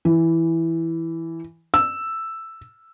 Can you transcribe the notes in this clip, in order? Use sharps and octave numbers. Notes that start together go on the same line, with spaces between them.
E3
E6